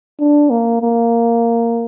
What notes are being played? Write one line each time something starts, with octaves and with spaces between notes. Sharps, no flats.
D4
A#3
A#3